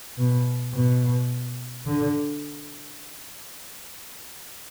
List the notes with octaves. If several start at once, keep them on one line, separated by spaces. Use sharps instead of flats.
B2
B2
D3